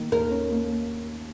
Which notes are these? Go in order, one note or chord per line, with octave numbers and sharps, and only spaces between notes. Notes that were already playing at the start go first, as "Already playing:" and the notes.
Already playing: D#3 A#3
D#2 A#4
C#4
A#3